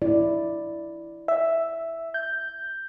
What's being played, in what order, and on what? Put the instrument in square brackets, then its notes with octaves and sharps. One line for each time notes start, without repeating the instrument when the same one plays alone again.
[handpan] E4 D5
[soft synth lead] E5
G6